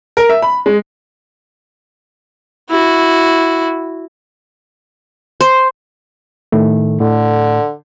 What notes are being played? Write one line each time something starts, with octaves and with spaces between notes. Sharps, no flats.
A#4
E5
B5
G#3
E4 F#4
C5
A2 D#3 A3
A2 D3